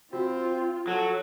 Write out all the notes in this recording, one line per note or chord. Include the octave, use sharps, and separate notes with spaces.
C4 F4 F#4
F#3 A4